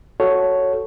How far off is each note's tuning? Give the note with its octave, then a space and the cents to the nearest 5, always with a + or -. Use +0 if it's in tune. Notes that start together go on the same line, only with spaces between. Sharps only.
F#4 +0 A4 +0 C#5 +0